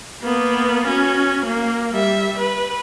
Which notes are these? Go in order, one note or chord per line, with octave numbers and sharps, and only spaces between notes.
A#3 B3
C#4 F#4
A#3
G3 E5
B4